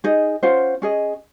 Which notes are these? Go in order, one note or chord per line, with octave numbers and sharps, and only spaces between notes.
D#4 G#4 D#5
C#4 F4 C5 F#5
C#4 G#4 D#5